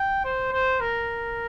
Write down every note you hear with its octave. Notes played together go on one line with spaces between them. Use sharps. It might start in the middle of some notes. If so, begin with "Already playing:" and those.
Already playing: G5
C5
C5
A#4